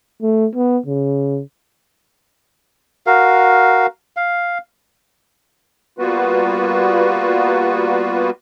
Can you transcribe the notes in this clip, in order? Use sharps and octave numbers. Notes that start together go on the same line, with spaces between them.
A3
B3
C#3
F#4 A#4 F5
F5
G3 A#3 B3 F4 F#4 B4